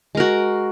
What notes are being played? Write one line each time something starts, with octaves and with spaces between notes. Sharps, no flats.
G#3 F#4 A#4